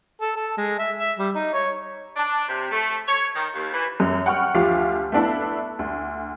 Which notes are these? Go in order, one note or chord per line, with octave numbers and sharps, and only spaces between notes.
A4
A4
G#3
E5
E5
G3
D#4
C#5
D4
C3
A3
C#5
D#3
D#2
E3
F#2
F#5 G5 C#6 F6
D2 F3 G4 F5 D6 C7
A3 B3 D4 E4 A4
D2